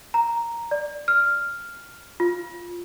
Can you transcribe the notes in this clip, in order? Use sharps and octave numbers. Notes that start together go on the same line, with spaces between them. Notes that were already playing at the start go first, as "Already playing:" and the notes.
A#5
D5
F6
F4